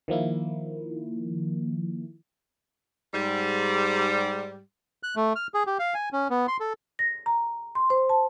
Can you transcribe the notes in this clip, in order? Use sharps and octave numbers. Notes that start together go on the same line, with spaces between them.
D#3 F3 A#3 E4
G#2 G3
F#6
A3
F6
G#4
G4
F5
G#5
C#4
B3
C6
A4
A#6
A#5
C6
C5
A5